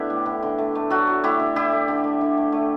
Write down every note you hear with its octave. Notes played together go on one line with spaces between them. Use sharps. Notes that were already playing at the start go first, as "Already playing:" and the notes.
Already playing: D3 A3 B3 D4 E4 G4
A2
D3
D3
A3
A3
F#3 F#4 A4
F#3
A3 E4 G4
D3
D3 E4 G4
A3
D3
A3
D3
A3
A3